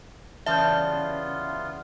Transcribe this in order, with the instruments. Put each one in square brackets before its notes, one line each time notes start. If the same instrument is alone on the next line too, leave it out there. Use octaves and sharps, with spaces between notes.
[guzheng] C#3 E3 G3 [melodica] B3 F4 [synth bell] E5 [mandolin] A5 G6